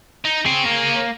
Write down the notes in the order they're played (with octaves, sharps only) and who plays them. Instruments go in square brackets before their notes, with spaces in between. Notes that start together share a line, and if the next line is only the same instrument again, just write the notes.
[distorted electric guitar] D#4
[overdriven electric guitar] C4 [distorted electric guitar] G#4 C#5
[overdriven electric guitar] A#3